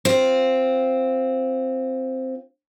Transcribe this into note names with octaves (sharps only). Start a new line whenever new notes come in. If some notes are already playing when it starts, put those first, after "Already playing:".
C4 F4